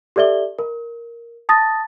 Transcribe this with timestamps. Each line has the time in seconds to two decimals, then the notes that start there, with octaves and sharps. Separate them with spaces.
0.16 G4 A4 D5 E5 G7
0.59 A#4
1.49 A5 D#6 A6 A#6